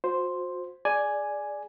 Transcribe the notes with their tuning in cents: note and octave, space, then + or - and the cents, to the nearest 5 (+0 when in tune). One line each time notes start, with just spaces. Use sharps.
F#4 -40 C5 +0
G#4 +0 D5 +0 G#5 +0